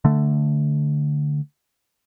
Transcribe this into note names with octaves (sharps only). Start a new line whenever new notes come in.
D3 A3